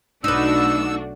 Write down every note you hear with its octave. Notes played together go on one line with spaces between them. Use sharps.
B1 A3 D4 D#4 F#4 B4 E6